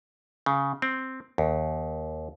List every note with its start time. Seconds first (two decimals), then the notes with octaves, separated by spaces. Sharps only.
0.46 C#3
0.82 C4
1.38 D#2